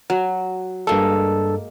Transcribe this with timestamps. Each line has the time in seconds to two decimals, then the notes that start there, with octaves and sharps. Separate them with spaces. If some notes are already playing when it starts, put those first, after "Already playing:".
0.10 F#3
0.87 G2 G#3 A#3 A4